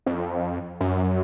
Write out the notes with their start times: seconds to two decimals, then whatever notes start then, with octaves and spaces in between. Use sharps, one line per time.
0.06 F2
0.80 F#2